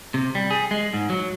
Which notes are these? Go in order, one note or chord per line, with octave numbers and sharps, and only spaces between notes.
C3
G3
G#4
G#3
G#2
F#3